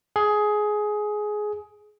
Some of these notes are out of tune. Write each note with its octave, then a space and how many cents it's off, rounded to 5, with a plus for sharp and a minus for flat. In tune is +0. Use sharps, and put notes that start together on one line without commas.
G#4 +15